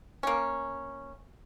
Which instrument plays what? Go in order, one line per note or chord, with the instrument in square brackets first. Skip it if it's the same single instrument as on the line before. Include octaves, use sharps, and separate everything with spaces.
[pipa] A#3 C#4